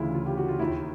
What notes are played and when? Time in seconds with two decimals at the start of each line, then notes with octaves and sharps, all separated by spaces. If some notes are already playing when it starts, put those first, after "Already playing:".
Already playing: D2 C#3 E3 E4 F4
0.15 F4
0.26 G4
0.37 F#4
0.48 F4
0.59 D#2 D#3 E4